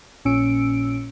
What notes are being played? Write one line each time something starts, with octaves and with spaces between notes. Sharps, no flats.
A#1 A#2 C#4 E6 C#7 D7